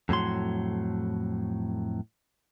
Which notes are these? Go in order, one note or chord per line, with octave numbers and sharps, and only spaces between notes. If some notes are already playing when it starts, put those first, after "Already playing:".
F2 A2 F#3 C6